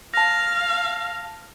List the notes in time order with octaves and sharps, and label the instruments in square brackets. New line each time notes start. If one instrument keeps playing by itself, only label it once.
[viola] F5 [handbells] A5 A#6